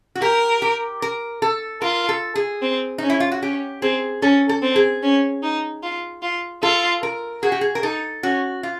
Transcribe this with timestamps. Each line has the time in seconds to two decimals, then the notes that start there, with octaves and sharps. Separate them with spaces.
0.15 F#4
0.22 G4 A#4
0.62 G4
1.02 A#4
1.42 A4
1.82 F4 A#4
2.09 A4
2.35 G#4
2.62 C4
2.98 C#4 D#4
3.10 E4
3.20 F4
3.32 F#4
3.42 C#4 G4
3.82 C4 G#4
4.22 C#4 A4
4.49 A4
4.62 C4
4.76 G#4
5.03 C#4
5.43 D#4
5.83 F4
6.22 F4
6.63 F4 A4
7.03 A#4
7.43 F#4 G#4
7.52 G4
7.61 G#4
7.75 A#4
7.83 D#4 A4
8.23 C#4 F#4
8.63 F4